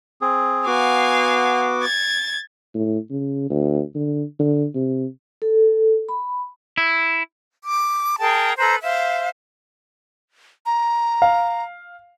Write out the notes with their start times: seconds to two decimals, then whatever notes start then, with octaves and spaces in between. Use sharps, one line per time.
0.21 C4 G#4
0.66 B3 F#4 F5 G#5 D6
1.83 G#6 A6
2.74 A2
3.10 C#3
3.50 D2
3.95 D3
4.39 D3
4.75 C3
5.42 A4
6.09 B5
6.78 E4
7.65 D6
8.19 G#4 A#4 G5 A5
8.58 A4 B4 C5 A#5
8.82 C5 E5 F5
10.66 A#5
11.22 F5